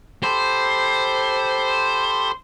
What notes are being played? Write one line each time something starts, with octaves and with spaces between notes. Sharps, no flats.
G4 A4 C5 B5